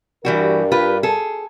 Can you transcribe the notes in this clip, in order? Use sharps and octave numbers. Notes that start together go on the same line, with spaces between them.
G2 E3 G3 F#4 A#4
F4 G4 B4
G#4 A4